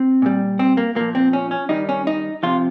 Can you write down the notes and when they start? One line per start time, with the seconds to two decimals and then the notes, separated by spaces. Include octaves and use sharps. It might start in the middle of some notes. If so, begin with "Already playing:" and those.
Already playing: C4
0.22 A#2 G3
0.59 C4
0.77 A#3
0.95 A#2 F3 A#3
1.15 C4
1.33 C#4
1.51 C#4
1.69 G2 D#3 G3 D#4
1.89 C#4
2.07 D#4
2.43 C3 F3 F4